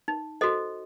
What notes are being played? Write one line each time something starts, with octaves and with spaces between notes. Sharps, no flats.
D#4
F#4 A4 C5 D#5